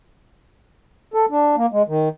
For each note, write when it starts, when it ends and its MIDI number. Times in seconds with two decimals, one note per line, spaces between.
1.14 1.26 69
1.30 1.56 62
1.56 1.66 58
1.72 1.83 56
1.88 2.09 51